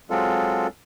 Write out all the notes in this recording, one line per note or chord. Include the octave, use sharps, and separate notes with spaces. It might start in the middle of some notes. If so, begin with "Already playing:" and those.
F#3 G#3 C4 F4 A4